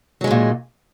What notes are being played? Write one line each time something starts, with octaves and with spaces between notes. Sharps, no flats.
A#2 D#3 F#3 G#3